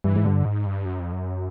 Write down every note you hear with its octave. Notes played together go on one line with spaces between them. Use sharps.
G2 E3
G#2
G2 D3
G#2
G2
F#2
F2
F#2